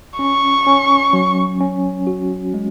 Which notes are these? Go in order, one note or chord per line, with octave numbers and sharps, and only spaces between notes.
C#4 C#6
C#4
F#3
C#4
F#4
G#3